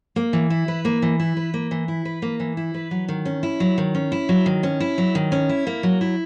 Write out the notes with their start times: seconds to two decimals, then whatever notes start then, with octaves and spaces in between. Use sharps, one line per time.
0.16 A#3
0.33 E3
0.50 E4
0.68 B4
0.85 A#3
1.02 E3
1.20 E4
1.37 B4
1.54 A#3
1.71 E3
1.88 E4
2.05 B4
2.22 A#3
2.40 E3
2.57 E4
2.74 B4
2.91 F#3
3.08 D#3
3.25 C#4
3.43 E4
3.60 F#3
3.78 D#3
3.95 C#4
4.12 E4
4.29 F#3
4.46 D#3
4.63 C#4
4.80 E4
4.98 F#3
5.15 D#3
5.32 C#4
5.49 E4
5.67 A#3
5.83 F#3
6.01 E4